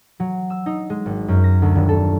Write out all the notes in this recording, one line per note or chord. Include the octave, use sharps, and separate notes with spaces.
F#3
E6
D#4
G#3
G#1
F#2
A#6
D2
D#1
A4